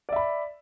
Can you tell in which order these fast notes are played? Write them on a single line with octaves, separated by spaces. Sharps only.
D5 E5 B5